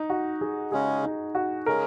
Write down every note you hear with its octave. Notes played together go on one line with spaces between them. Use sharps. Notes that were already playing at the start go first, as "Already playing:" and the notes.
Already playing: D#4
F#4
G#4
C#3 G#3 C#4 G#4
D#4
F#4
C#3 G#3 C#4 A#4